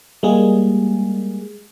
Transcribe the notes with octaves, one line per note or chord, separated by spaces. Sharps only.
G3 G#3 A#3 G#4